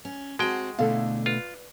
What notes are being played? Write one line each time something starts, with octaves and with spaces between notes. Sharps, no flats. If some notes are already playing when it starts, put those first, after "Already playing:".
C#4
G#3 C4 F#4 G5 A5
B2 D3 A3 E4 A4 F5
F4 B4